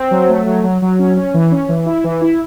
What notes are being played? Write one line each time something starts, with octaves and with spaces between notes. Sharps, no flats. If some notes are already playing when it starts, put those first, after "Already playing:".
Already playing: C4
F#3
A3
F#3
F#3
F#3
C#4
C#4
E3
C#4
E3
E4
E3
E4